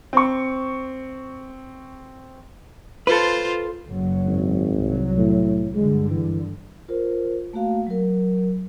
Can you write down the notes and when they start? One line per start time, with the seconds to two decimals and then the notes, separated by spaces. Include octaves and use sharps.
0.13 C4 C#6
3.07 F4 A4 B4 C5
3.89 F#1 F#3
4.25 G#1
4.72 C2 F#3
5.17 A2
5.75 G2 D3 G#3
6.10 E3
6.88 F4 A#4 C5
7.53 A3 A#3 F#4 F5
7.87 F#3 A#4